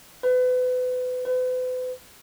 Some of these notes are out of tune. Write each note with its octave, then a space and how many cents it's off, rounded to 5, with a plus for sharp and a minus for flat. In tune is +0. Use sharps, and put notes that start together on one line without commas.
B4 +35
B4 +45